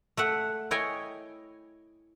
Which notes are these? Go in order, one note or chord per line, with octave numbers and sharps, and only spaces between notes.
A3 E5 F#5
E4 C#5 D#5 G5 G#5